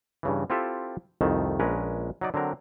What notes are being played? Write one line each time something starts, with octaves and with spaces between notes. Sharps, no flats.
G2 C#3 E3
C4 E4 F4 G4 A4 E5
C2 F2 D#3 A3 A5
A#1 G#3 C#4 A#4 B4
F#3 D#4 D5
D3 F#3 C4 A#4